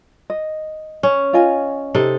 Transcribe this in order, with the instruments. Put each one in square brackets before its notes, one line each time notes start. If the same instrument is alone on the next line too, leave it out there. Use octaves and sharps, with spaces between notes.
[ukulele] D#5
[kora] C#4
[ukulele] F4 D#5 G#5
[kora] C3 D#4 A4